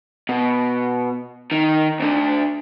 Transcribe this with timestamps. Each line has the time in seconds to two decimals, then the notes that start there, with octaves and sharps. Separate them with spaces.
0.29 B2
1.52 D#3
2.00 D2 D3